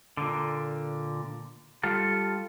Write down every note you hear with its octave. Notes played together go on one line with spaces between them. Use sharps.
A#2 D3
G3 F4 A4